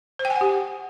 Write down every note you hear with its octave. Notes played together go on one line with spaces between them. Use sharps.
C5
G5
G#5
F#5
G4